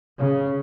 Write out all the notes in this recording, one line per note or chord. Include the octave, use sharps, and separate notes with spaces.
C#3